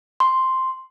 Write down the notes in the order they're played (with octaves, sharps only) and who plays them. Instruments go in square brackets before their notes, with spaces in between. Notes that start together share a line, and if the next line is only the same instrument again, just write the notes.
[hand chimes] C6